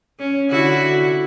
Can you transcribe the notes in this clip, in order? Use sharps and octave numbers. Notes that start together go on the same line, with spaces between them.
C#4
D3 E4 F#4